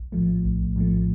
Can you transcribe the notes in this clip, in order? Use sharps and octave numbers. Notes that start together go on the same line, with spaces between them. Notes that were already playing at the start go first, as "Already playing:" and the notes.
Already playing: A#1
A2 F3 A3
A#1
A2 F3 A3